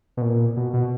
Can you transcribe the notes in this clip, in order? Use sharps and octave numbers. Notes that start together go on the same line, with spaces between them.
B2
A#2
B2
B2